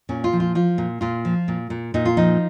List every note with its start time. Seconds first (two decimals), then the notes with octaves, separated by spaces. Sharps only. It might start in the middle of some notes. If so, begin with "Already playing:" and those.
0.09 A#2 C#4
0.24 F4
0.33 F3
0.40 F4
0.55 F3 F4
0.78 A#2
1.01 A#2 F4
1.25 F3
1.48 A#2
1.70 A#2
1.94 A#2 D#4
2.05 F4
2.17 F3 D#4